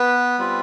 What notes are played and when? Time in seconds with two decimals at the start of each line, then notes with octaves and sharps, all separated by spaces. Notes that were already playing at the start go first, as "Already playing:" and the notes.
Already playing: B3 B4
0.38 G3 C4 F4